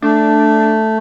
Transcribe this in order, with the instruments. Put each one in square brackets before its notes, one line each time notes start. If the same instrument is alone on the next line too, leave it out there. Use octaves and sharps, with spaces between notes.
[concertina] A3 [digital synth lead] D4